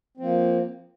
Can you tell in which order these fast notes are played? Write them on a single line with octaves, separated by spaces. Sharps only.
C4 F3 A#3